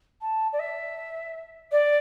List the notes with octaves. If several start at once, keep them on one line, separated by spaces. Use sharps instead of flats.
A5
D5
E5
D5